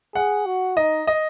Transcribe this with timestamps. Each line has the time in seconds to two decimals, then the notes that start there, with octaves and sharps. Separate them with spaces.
0.15 G#4 F#5
0.46 F#4
0.77 D#4 D#5
1.07 D#5